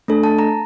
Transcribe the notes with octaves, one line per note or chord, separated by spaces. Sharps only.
A3 D4 A4
A5
A#5